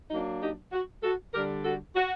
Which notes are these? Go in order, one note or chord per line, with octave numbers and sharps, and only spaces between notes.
F#3 A#3 D4 D#4
D#4 G4
F#4
F#4 A4
D3 G3 D4 G4 A#4
F#4 A4
F#4